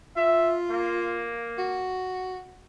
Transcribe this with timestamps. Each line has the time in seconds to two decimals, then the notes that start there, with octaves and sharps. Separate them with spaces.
0.16 F4 E5
0.71 A#3
1.58 F#4